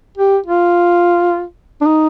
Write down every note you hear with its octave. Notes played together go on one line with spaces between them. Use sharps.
G4
F4
D4
D#4